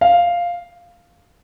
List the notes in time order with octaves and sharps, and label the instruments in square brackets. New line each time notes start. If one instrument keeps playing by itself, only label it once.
[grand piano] F5